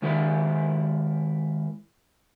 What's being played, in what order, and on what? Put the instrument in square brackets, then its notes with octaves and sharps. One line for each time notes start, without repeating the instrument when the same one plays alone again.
[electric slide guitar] D#3 G#3 E4 A#4